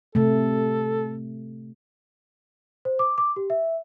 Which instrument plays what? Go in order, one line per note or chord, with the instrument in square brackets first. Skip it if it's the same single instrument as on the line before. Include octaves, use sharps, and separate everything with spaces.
[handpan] C3 A3 [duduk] A4
[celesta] C5
D6
D6
G4
E5